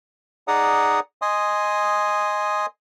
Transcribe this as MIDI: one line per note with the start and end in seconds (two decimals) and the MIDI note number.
0.48 1.00 63
0.48 1.00 68
0.48 1.00 74
0.48 1.00 78
0.48 1.00 82
0.48 1.00 87
1.22 2.66 75
1.22 2.66 80
1.22 2.66 84
1.22 2.66 87